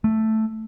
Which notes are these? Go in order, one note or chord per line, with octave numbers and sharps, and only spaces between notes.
A3